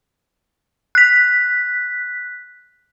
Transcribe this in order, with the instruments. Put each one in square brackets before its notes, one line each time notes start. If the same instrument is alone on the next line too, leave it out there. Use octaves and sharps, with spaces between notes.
[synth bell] F#6 B6